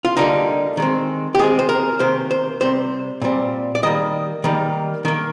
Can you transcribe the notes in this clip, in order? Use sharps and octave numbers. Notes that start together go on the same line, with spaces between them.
F4
D3 G3 A#3 D#4
D#3 G#3 C4
G4
D#3 G#3 C4 G#4
C5
A#4
C3 D#3 A#3 C5
C5
C3 G3 C4 C5
A#2 G3 C4
D5
D#3 G3 A#3 D#5
D#3 G3 A#3
D#3 A#3